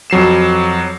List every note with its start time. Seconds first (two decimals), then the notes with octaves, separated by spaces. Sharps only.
0.10 F2 F#3 C7 E7